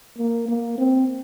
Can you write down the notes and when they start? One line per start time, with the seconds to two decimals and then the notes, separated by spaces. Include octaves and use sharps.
0.18 A#3
0.48 A#3
0.78 C4